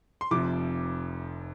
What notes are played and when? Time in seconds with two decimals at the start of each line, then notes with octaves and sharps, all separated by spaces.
0.21 C6
0.31 F1 F2 C3 F3 D6